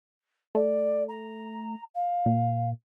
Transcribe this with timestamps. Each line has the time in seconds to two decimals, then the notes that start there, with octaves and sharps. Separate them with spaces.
0.55 A3 D5
1.08 A#5
1.94 F5
2.26 A#2